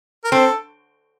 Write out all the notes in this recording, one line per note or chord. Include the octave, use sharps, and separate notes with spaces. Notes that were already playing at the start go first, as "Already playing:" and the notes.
A#4
C4 A4